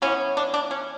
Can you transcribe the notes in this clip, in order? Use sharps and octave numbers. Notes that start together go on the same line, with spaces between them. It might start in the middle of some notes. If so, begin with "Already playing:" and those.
E3 B3 C#4
D4
D4
C#4